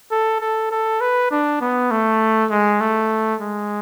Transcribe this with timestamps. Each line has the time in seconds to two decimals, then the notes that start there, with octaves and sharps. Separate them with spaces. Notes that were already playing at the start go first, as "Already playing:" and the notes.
0.12 A4
0.41 A4
0.71 A4
1.01 B4
1.31 D4
1.61 B3
1.91 A3
2.51 G#3
2.81 A3
3.41 G#3